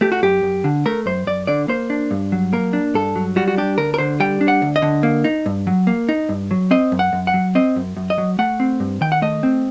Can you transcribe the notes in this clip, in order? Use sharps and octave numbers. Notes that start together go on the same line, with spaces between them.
A3 G4
F#4
F#2 G4
F#2
D3
A3 A#4
F#2 C5
F#2 D5
D3 D5
A#3 C5
D4
G2
F#3
A#3 A#4
D4
G2 A4
F#3
G3 F#4
F#4
D4 G4
D2 A#4
A#4
D3 C5
G3 G5
D4
F#5
D2
D#5
D3
A#3
D#4
G2
F#3
A#3
D#4
G2
F#3
C4 D#5
F#2
F#5
F#2
F#5
F#3
C4 D#5
F#2
F#2
D#5
F#3
A3 F#5
C4
G2
D#3 G5
F#5
A3 D#5
C4